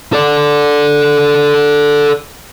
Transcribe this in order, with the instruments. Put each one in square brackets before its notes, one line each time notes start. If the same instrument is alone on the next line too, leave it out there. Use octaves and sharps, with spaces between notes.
[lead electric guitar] A4 D5